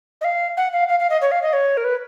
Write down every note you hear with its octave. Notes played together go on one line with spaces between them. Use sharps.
D#5
F5
F#5
F5
F5
F5
D#5
C#5
F5
D#5
C#5
A#4
B4